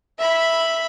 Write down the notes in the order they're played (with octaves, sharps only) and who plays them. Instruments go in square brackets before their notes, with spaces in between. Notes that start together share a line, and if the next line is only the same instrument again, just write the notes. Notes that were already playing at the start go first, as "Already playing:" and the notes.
[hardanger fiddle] E5 B5